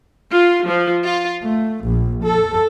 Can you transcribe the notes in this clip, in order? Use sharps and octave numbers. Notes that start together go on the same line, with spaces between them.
F4
F3
F4
A3
A#1
A4